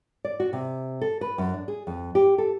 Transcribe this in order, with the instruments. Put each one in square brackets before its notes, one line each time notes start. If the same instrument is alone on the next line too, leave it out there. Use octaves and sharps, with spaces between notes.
[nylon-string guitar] D5
F#4
C3
A4
B4
F#2
D4
G#4
F2
G4
A4